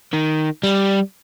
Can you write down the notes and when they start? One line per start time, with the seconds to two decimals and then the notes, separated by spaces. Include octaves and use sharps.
0.13 D#3
0.63 G3